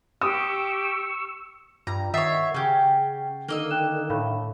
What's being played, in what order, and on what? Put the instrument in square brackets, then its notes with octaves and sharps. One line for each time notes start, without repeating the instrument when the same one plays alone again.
[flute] G4 [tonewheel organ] C#6 E6 [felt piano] D#6
[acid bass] G2 [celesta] F4 [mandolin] A#5
[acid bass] D#3 [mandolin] C#5 E5 [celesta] F#5 A6 C7
[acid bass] C#3 [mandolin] C#4 G4
[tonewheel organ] D3 D#3 [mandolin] A#3 D#5 E6
[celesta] G5 F#6 E7
[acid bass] A2 [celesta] F5 B5